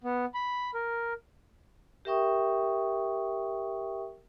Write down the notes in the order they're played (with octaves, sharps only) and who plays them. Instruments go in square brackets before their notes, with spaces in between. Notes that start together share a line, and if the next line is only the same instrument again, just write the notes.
[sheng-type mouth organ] B3
B5
A#4
[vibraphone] G4 A#4 E5 G5 C#6 D#6